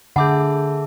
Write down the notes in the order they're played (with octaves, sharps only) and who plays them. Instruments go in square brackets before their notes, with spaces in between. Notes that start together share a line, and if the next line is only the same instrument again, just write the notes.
[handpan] D3 [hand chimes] G#4 E5 A5 [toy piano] F#5 [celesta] B5 D6 G6